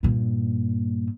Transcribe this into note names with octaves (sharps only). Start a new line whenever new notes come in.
G2 A#2